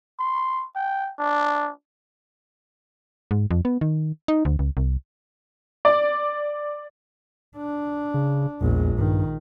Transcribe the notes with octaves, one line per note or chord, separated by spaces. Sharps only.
C6
G5
D4
G#2
F2
B3
D#3
D#4
D2
C#2
C2
D5
D4
C#3
A#1 E2 G#3
G2 D#3